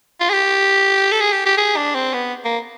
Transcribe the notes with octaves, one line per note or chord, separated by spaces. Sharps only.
F4
G#4
G4
A4
G#4
G4
G4
G#4
D4
C4
B3
A#3